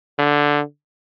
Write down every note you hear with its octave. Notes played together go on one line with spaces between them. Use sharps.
D3